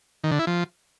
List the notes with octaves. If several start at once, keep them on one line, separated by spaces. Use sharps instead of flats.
D#3
D3
E4
F3